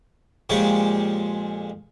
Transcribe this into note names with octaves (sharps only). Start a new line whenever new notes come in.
F2 A#2 G#3 G4 C#5